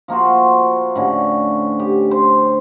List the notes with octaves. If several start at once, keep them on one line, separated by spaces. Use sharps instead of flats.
F3 A#3 F4 F#4
A2 D3 C#4
G4
C5